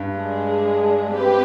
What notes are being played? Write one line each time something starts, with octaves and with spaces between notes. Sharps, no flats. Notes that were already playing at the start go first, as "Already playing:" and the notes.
Already playing: G2
G#3 D4 G#4
C4 G4 B4